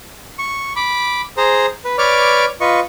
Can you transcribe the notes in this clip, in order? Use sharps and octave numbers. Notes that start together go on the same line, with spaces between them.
C#6
B5 D6
G#4 C5 A#5
B4
B4 C#5 D5 D6 F6
F4 B4 D#5 C#6